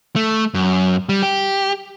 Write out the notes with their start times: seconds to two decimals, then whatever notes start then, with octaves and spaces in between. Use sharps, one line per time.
0.16 A3
0.54 F#2
1.09 G3
1.23 G4